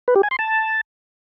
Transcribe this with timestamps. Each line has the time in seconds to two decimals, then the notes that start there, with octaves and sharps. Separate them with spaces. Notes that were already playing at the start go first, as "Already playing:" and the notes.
0.08 B4
0.16 G4
0.23 G#5
0.31 C6
0.39 A5